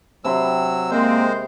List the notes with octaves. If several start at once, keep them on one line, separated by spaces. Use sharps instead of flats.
C3 F#3 B5 C6 E6
G#3 A#3 C4 C5